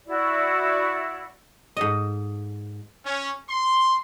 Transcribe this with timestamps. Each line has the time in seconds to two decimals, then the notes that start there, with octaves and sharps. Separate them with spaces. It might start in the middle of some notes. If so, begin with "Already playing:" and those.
0.07 E4 F#4 D5
1.77 G#2 A4 D#5
3.05 C#4
3.48 C6